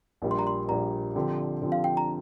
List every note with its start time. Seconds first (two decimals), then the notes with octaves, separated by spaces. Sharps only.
0.22 A#1 A#2 G3
0.31 C6
0.39 A#5
0.47 C6
0.68 A#1 A#2 G3 A#5
1.16 D3 F3 C4 G4
1.62 D3 F3 C4 G4
1.72 F5
1.84 G5
1.97 A#5